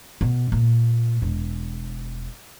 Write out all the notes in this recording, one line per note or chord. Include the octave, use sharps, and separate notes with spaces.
B2
A#2
E1